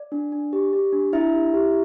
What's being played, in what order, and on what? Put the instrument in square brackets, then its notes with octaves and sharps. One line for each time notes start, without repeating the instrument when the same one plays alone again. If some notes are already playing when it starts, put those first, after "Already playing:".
Already playing: [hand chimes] D5
D4
D4
G4
G4
D4
D4 E4 E5
G4
G4